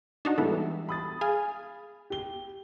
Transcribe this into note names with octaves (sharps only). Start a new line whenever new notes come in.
D4 D#4 F#4
E3 G3 G#3 B3 E4 A4
B5 D#6 A6
G#4 F5 G#5
G4 G7